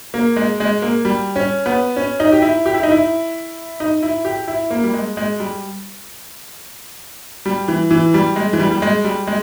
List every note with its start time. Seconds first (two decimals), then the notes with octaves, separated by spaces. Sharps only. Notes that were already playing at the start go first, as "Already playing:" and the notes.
0.14 A#3
0.36 G#3
0.60 G#3
0.82 A#3
1.05 G3
1.36 C#4
1.66 B3
1.96 C#4
2.20 D#4
2.32 G4
2.42 E4
2.66 G4
2.74 E4
2.83 D#4
2.91 E4
3.80 D#4
4.03 E4
4.25 G4
4.48 E4
4.71 A#3
4.84 G3
4.94 G#3
5.17 G#3
5.40 G3
7.46 G3
7.68 E3
7.91 E3
8.14 G3
8.36 G#3
8.53 E3
8.60 G3
8.71 G3
8.82 G#3
9.04 G3
9.27 G#3